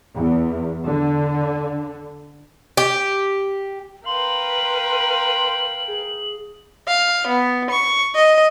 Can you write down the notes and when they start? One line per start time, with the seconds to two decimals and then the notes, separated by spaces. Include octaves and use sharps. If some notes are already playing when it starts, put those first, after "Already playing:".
0.14 E2
0.86 D3
2.77 G4
4.06 A#4 B4 F5 G5 C6 F#7
5.88 G#4
6.89 F5
7.28 B3
7.71 C#6
8.16 D#5